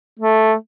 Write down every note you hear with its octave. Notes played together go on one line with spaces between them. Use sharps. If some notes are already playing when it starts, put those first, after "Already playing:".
A3